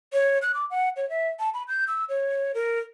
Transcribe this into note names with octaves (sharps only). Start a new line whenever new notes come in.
C#5
F#6
D6
F#5
C#5
E5
A5
B5
G6
E6
C#5
A#4